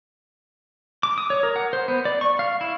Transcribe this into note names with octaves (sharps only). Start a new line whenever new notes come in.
D6
D#6
C#5
A#4
F#5
C5
B3
D5
C#6
F5
E4